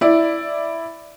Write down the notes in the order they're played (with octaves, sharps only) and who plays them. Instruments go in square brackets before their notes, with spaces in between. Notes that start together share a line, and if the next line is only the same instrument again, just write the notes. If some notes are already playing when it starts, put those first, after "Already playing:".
[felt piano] E4 D5